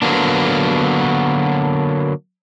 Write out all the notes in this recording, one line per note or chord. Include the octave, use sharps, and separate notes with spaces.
D3 F#3 A#3 B3 D4